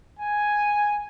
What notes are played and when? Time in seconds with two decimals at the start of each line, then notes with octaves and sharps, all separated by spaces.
0.19 G#5